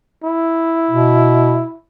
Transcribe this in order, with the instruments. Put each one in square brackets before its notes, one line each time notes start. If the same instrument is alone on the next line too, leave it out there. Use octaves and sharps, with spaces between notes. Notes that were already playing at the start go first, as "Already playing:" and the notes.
[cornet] E4
[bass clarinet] B2